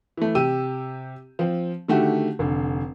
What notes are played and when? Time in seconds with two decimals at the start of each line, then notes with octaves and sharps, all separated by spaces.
0.17 E3 A3
0.35 C3 G4 E6 D#7
1.39 F3 C4
1.88 D3 D#3 A3 F#4 G4
2.39 F1 D3